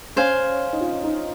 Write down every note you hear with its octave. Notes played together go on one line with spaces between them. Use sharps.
C#4 C5 F5 G#5
D#4
F4
D#4